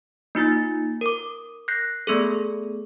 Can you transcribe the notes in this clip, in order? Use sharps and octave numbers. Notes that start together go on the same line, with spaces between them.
A#3 D#4 F4 A6
A#4 D6
F#6 G6 A#6 C7
A3 B3 G#4 A4